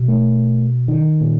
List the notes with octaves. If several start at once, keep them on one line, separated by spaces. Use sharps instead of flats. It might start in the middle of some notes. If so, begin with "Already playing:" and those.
Already playing: B2
A3
D#3
A#2